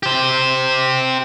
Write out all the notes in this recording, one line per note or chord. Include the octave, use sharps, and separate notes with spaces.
G4 C5